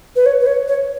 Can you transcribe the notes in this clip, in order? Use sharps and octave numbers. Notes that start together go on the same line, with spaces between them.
B4
C#5
B4
C#5
C#5